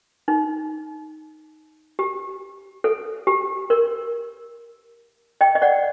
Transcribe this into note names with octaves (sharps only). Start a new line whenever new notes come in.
D#4
G4
A4
G4
A#4
D#5 G5
D#5
D5 F#5